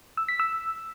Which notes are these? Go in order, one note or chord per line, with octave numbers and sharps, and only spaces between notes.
E6
B6
E6